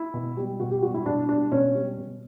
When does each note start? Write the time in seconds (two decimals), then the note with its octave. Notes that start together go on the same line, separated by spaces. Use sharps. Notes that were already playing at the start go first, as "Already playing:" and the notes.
Already playing: E4
0.14 B2
0.37 G3
0.60 B2 F#4
0.71 G4
0.82 G3 F#4
0.94 E4
1.06 B2 D4
1.29 G3 D4
1.52 B2 C#4
1.75 G3
1.98 B2